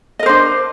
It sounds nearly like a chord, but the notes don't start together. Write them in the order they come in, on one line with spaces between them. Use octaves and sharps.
D#5 A#4 C5 D4